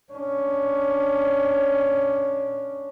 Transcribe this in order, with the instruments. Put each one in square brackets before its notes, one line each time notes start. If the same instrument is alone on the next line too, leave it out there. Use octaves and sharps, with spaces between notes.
[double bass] C#4 D4